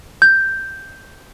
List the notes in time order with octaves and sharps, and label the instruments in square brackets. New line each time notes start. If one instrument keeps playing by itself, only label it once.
[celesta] G6